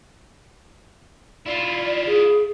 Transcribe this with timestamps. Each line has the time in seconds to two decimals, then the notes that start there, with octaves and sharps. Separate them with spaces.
1.46 E4 F4 D5
2.06 G#4